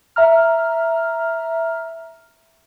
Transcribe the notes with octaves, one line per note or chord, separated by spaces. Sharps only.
E5 A#5 F6